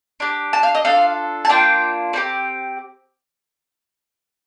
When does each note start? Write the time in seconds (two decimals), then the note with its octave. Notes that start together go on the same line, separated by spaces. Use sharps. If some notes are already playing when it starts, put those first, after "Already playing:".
0.20 D4 G4
0.53 A5
0.63 F5
0.75 D#5
0.85 D4 F4 A4 F5
1.45 A5
1.49 A#3 D4 F4 G5
2.13 C4 D#4 G4